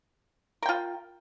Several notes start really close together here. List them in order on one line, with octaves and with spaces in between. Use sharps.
A#4 G5 F4